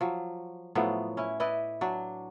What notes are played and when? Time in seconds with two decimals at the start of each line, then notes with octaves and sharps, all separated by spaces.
0.01 F3 F#3
0.75 A2 F3 F#3 B3
1.17 C#4 E4
1.40 E4 B4 D5 D#5
1.81 F#3 D4